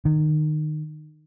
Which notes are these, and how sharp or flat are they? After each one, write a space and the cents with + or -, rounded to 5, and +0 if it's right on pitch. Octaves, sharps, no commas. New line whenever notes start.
D#3 -25